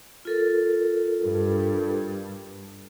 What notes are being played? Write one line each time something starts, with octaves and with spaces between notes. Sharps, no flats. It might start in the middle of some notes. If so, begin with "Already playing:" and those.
F4 A4 A#4
G2